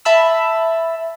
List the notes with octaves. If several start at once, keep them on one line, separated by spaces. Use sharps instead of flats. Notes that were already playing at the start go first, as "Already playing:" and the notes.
E5 A5 B5 E6